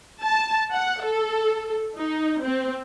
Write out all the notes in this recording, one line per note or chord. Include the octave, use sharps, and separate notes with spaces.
A5
F#5
A4
D#4
C4